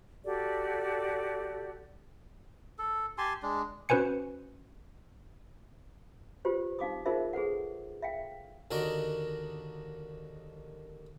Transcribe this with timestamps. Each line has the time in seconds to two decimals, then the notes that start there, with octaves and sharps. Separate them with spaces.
0.24 F#4 G4 A4 D5
2.79 A4
3.18 G4 G#5 A5 C6
3.43 G#3 D4
3.89 C#4 F#4 B4 C5 G#5 C#7
6.45 F4 G4 B4 C5
6.79 D#4 F5 D6 D#6
7.06 D#4 F4 G#4 A#4 C5 E5
7.33 G#4 A4 B4 F#5
8.02 E5 F5 G5
8.71 D#2 D3 F#4 A#4 D5 D#5